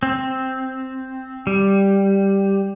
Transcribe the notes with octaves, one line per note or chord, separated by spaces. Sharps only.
C4
G3